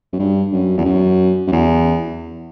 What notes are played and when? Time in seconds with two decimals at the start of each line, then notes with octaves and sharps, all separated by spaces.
0.13 F#2
0.19 G2
0.52 F#2
0.78 E2
0.85 F#2
1.47 F#2
1.52 E2